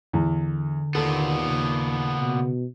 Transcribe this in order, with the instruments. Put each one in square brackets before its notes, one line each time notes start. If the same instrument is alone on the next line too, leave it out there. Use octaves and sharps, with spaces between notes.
[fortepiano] E2 [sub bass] D3
[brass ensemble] D#2 [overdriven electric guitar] A#2 B3 [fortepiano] A4
[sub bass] C#3
[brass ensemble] B2